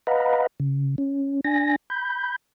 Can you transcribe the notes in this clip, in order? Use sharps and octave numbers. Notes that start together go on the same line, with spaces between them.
B4 D#5 F5 F#5 A#5 B5
C#3
C#4
D4 G#5 A#6
B5 G6